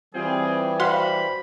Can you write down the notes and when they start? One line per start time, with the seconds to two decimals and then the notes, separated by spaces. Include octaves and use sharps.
0.15 E3 G3 C4 F4 G#4
0.80 F#4 C5 F5 F#5 B5 C6